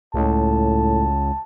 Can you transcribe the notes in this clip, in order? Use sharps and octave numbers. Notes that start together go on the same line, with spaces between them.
C#2 A2 A5